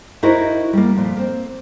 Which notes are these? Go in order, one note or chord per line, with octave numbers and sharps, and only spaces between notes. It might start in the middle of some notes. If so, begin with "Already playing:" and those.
D#4 E4 F#4 A#4 C5 D#5
G3 A#3
F2 A#2
A#3 C4